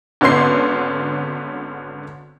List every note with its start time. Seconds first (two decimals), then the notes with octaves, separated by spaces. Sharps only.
0.21 G#1 D3 B3 C#4 C6 C7